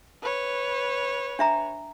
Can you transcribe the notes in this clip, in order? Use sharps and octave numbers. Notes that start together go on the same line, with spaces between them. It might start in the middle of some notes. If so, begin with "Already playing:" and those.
B4 C#5
D4 E5 A#5